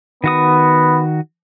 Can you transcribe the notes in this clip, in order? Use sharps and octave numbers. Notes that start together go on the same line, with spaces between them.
D#3 B3 F#4 D#6